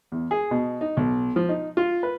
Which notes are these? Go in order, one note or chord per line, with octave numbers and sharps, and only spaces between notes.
E2
G#4
B2
D#4
B1
F3
D#4
F4
B4